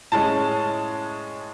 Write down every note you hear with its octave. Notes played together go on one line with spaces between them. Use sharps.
A2 G#3 C#4 A5